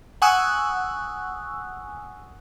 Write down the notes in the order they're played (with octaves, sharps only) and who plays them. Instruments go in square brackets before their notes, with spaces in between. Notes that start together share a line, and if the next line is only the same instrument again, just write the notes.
[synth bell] F#5 G#5 C#6 D#6 E6 F#6